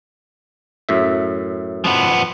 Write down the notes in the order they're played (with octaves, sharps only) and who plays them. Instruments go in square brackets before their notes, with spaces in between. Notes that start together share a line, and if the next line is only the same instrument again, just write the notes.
[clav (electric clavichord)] F#2 A2 E5
[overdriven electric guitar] F3 B3